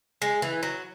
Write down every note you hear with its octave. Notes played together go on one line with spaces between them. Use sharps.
G#3
E3
F#3